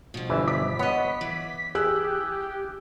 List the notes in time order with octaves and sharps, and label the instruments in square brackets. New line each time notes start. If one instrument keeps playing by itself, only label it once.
[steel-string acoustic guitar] B2 F3
[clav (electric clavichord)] G1 E3 E5
[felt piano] D6 [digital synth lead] B6
[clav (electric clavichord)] B3 [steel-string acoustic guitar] C#5 D#5
[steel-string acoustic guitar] E3
[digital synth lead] G4 [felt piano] G#4 E6 F#6